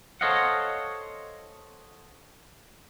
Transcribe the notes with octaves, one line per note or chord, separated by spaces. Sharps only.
A4 C5 C#5 D#5 F5 F#5